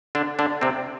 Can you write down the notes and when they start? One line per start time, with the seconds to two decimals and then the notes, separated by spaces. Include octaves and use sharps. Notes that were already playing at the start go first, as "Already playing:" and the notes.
0.15 D3 D4
0.39 D3 D4
0.61 C3 C4